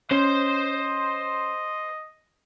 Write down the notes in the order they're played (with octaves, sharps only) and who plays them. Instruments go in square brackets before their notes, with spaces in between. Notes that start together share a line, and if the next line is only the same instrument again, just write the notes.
[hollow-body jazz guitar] C#4 [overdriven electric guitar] C5 C6 [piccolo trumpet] D#5